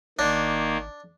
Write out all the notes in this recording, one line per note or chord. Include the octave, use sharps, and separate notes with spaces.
G#1 D#3 A#3 D4